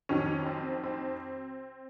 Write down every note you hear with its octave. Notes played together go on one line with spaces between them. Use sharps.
F2 D#3 F#3 C#4
C4
C4